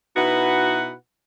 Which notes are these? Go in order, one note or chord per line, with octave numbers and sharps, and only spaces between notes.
B2 D#4 E4 F#4 B4 F#5